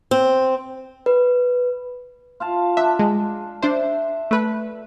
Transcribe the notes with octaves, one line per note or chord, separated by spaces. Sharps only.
C4
B4
F4 F5 A5
D4 E5
G#3
D4 C5 E5
A3 B4